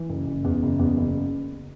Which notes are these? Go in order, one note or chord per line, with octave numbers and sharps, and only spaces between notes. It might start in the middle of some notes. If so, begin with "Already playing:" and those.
Already playing: E3
F#1
F#1
E2
F#1
E2
F#1